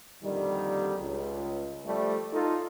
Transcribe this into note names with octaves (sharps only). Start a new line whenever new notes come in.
F2 A#2 D3 D#3 G3
C#2
F3 G3 A3
D#4 F4 A4